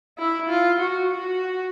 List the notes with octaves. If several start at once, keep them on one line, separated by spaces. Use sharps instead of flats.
E4
F4
F#4
F#4